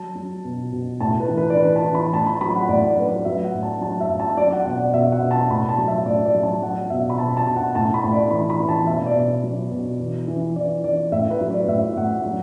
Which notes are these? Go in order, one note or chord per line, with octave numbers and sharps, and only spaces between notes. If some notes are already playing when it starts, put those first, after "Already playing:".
Already playing: F#3 A5
F#3
B2
B2
A2 A5
B4
E3
B4
D5
E3 B4
A5
E3
B5
A2 A5
B5
F#3 B5
F#5
A2 D5
D5
F#3 B4
D5
F#3 E5
F#5
A2
A5
F#3 A5
E5
A2
A5
F#3 D5
F#5
B2 F#5
D5
B2 E5
F#5
B2
A5
A2 B5
A5
F#3
E5
A2 D5
D5
F#3
A5
F#3 F#5
B2 E5
B5
B2 A5
A5
B2
F#5
A2 A5
B5
A2
D5
E3 B5
B5
E3
A5
B2 E5
D5
B2
F#3
B2
E3
E3
E3 D5
E3 D5
A2 E5
B4
F#3
D5
A2 E5
A2 F#5
F#3